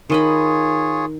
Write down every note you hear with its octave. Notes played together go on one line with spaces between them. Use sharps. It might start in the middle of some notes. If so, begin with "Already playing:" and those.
D#3 F4 G#4 C#5 D#5 B5